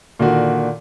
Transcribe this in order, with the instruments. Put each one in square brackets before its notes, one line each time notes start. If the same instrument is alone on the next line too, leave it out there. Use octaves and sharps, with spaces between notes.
[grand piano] A#2 D3 D#3 F#4